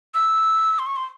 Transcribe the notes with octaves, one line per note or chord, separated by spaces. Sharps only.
E6
C6
C#6
C6